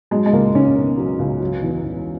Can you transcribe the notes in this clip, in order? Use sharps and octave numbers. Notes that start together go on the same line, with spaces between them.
F#3 G#3
G#3
C#2 A#3
C#2 C#4
B2
F#3
C#2
F#3
E2
E2